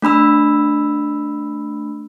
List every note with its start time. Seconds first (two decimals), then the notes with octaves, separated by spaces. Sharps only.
0.02 A3 D4 B5 E6